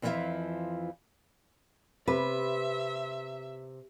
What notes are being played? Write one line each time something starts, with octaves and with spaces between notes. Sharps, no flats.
F2 E3 F3 D4 E5 F5
C3 B4 E5